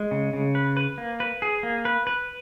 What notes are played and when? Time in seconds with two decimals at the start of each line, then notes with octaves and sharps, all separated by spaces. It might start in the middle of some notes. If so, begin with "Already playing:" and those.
Already playing: G#3
0.11 C#3
0.33 C#3
0.55 B4
0.77 B4
0.98 A#3
1.20 B4
1.42 G#4
1.63 A#3
1.85 B4
2.07 B4